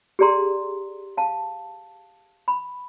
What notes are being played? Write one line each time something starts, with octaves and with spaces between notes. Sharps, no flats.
G4 G#4 D5 A#5 C6
F5 A5
B5